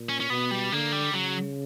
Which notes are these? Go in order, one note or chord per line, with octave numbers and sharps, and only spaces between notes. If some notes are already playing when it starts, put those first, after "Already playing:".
Already playing: A#2
C#4
C#4
B2 B3
G3
D3 A#3
G3
C#3 F#3